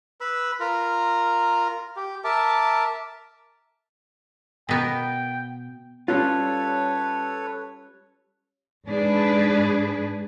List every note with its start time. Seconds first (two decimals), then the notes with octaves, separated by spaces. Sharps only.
0.21 B4 B5 E6
0.60 F4 A#4 A#5
1.96 G4
2.24 A#4 E5 A5 D6
4.69 B2 B3 A#4 G5
6.08 G3 C#4 F4 A4 B4 C#5
8.89 G#2 D4 G#4 B4